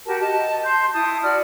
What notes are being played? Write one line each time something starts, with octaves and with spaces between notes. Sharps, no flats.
F#4 G4 A#4 A5
D#5 A5
C6 G6
E4 A5 D#6
F#4 D5 F6